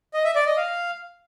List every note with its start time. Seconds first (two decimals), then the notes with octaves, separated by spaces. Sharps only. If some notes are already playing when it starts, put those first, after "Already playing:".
0.14 D#5
0.24 E5
0.35 D5
0.46 D#5
0.57 F5